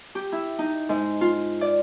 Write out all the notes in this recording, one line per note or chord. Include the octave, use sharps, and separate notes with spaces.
G4
E4
D#4
G#2
F4
D5